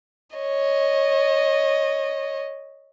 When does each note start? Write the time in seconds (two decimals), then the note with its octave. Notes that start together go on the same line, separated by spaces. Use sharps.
0.36 C#5 D#5